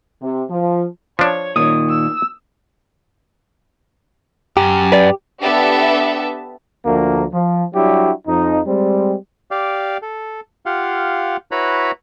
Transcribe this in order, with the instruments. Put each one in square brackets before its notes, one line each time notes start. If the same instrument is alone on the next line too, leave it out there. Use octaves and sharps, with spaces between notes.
[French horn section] C3
F3
[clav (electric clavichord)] F3 D4 [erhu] C#5
[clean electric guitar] A#2 D#3 [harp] D#6
[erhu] E6
[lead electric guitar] F#2 [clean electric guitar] G4
[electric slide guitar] B4 D5
[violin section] B3 D4 G4 A4 E5 A5
[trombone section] D2 F3 A#3
F3
F#3 G3 D4 E4 F#4 G4
F2 F3 D#4
G3 G#3 C4
[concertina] G4 D5 F5
A4
F4 G4 F5 F#5
E4 F#4 B4 C#5 A#5 B5